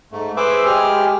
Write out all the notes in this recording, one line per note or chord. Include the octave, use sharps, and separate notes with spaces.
G#2 A3
G#4 B4 C5 E5 D6
G#3 G4 G#4 F6